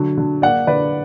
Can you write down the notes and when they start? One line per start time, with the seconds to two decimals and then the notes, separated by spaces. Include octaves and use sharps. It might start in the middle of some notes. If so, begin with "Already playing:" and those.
Already playing: D3 F#3
0.17 D3
0.42 A#3 D5 F#5
0.67 D3 B4 D5